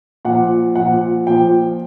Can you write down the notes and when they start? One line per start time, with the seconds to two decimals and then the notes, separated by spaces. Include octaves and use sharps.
0.25 A#2 F3 F#5
0.75 A#2 F3 F#5
1.27 A#2 F3 G5